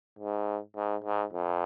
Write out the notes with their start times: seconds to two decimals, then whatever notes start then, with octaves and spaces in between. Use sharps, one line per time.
0.19 G#2
0.76 G#2
1.04 G#2
1.33 F2